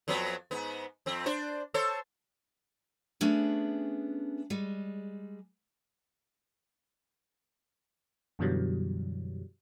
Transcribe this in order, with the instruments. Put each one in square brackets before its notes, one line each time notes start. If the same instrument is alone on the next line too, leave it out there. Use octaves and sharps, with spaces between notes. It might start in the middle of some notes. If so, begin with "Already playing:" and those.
[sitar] F2 F#3 B3
G#2 B3
F2 C4
D4 C5
A4 C5 C#5
[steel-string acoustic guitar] A3 B3 C#4 D4 G#4
G3 G#3
[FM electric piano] F#2 B2 D3 E3 F#3 G3